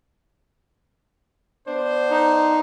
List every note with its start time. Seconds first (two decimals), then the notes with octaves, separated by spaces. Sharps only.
1.67 B3 D4 C5
2.10 D#4